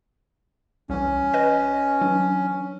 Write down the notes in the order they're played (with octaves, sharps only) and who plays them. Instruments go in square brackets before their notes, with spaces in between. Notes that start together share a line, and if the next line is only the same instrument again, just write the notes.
[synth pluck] C2 E3 [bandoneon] C#4
[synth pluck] B4 D#5 A#6
E3 F#3 D4